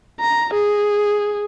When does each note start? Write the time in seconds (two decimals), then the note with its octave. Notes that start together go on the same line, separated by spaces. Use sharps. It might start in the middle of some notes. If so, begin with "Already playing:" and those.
0.21 A#5
0.54 G#4